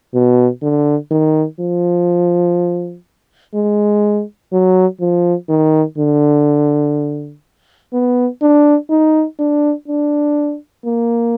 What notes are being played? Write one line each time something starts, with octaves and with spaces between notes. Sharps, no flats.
B2
D3
D#3
F3
G#3
F#3
F3
D#3
D3
B3
D4
D#4
D4
D4
A#3